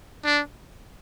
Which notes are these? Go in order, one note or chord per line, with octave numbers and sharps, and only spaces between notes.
D4